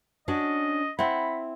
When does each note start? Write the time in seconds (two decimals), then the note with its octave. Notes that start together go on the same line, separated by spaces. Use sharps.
0.28 C#4 D4 F#4 D#5
0.99 C4 E4 F#5 B5